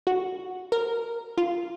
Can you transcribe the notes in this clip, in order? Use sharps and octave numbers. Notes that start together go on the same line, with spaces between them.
F#4
A#4
F4